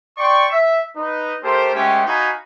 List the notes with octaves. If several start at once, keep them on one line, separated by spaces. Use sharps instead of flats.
D5 G5 C6 C#6
E5
D#4 B4
A3 G4 A4 A#4 C5
G#3 A3 B3 C#4 G4
D#4 F#4 F5 G#5 A#5 B5